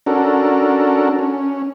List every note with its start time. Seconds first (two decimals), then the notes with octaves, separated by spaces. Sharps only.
0.06 C#4 D4 F#4 A4 A#4
1.19 C#4